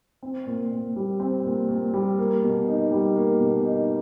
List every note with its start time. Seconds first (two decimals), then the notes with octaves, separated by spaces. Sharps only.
0.23 C4
0.46 A#2
0.72 A#2
0.96 G3
1.20 C4
1.45 A#2
1.69 A#2
1.94 G3
2.18 A#3
2.43 B2
2.68 D#4
2.92 G3
3.16 A#3
3.40 B2
3.65 D#4